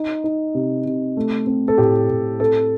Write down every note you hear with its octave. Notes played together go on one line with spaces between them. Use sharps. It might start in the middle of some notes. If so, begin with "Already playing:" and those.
Already playing: D#4
D#4
C3
C3
A3
C4
A4
A2 G4
A2
C4 A4